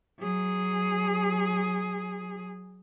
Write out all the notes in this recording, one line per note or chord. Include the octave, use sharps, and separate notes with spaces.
F#3 G#4